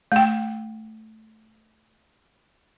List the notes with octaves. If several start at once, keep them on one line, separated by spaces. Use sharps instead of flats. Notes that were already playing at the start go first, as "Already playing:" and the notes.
A3 G5